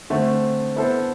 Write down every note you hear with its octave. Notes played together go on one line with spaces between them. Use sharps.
D3 A3 C4
B3 E4 A4 C5